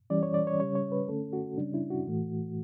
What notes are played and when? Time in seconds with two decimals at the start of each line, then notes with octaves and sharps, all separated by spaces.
0.10 E3 G3 C#4 D5
0.23 C#5
0.34 D5
0.47 C#5
0.59 C#3 G3 C#4 C#5
0.75 C#5
0.92 B4
1.08 D3 A3 C#4 A4
1.33 F#4
1.57 C#3 G3 C#4 D4
1.74 E4
1.90 F#4
2.07 A2 E3 A3